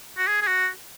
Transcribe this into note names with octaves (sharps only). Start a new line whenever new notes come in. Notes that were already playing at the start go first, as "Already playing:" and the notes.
F#4
G#4
G#4
F#4